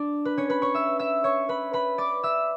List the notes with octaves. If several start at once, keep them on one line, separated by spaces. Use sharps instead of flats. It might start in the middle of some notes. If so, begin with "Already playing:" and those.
Already playing: D4 D5
B4
C#4 C#5
B4 B5
C#5 C#6
E5 E6
E5 E6
C#5 C#6
B4 B5
B4 B5
D5 D6
E5 E6